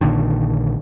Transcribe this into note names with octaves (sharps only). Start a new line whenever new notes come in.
A#1 A#2 D3 D#3